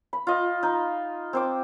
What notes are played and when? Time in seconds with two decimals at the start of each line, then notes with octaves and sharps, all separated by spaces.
0.13 B5
0.27 F4 D#5
0.63 D#4
1.33 C4 C5 D6